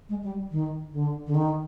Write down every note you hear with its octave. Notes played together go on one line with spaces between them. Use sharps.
G#3
G3
D#3
D3
D3
D#3